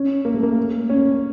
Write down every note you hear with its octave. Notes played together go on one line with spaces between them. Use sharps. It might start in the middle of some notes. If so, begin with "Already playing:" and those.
Already playing: C#4
A#3
A3
A#3
C#4